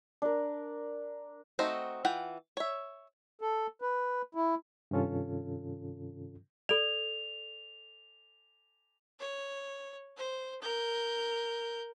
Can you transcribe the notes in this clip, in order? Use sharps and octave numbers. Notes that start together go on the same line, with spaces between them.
D4 A#4
A3 C4 D#4 F#4 C5
E3 F4 F#5 G5
C#5 E5
A4
B4
E4
G2 C3 D#3 C#4 F4 A4
A4 D5 F7
C#5
C5
A#4 G6